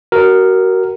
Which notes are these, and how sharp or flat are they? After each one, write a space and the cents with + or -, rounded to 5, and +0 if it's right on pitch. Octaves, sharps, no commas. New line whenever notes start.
F#4 +25 A#4 +0